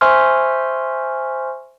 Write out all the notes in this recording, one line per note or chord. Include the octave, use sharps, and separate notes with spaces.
C5 E5 G#5 C6 C#6 F6